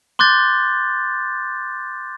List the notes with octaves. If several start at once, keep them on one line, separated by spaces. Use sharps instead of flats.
C6 D6 F#6 G6 A6